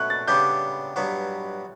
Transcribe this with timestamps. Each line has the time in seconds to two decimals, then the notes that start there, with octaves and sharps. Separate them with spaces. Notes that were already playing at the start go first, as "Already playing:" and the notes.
Already playing: B2 A3 C#4 C#6 F#6
0.10 A6
0.27 C#3 G3 B3 D4 G4 G6
0.96 G2 F#3 B3 F#4